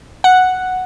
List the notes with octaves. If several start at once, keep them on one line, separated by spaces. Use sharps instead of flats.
F#5